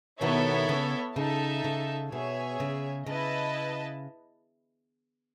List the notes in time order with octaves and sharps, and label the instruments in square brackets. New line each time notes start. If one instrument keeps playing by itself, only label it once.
[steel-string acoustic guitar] B2 D#3 [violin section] B3 E4 A4 C#5 E5
[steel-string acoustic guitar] C#3
[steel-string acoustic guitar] C#3 [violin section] D#4 A4 E5 A5
[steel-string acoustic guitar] C#3
[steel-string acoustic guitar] B2 [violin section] G#4 C#5 E5
[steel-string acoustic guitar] C#3
[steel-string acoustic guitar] C#3 [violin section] E4 B4 D#5 A5